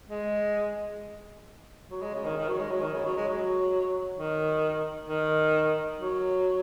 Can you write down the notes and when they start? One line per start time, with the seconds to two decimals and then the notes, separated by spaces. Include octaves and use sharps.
0.09 G#3
1.91 F#3
2.02 G#3
2.14 C#3
2.25 D#3
2.37 D#3
2.48 F#3
2.60 G#3
2.71 F#3
2.81 D#3
2.93 C#3
3.05 F#3
3.16 G#3
3.28 F#3
4.18 D#3
5.09 D#3
6.00 F#3